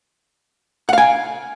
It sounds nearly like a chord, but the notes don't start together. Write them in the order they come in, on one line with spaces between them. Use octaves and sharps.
F#5 F5 G#5